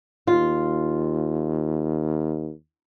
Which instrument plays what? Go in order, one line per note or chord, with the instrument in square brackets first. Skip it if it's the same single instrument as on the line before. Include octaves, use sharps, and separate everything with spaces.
[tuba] D#2 [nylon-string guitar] F4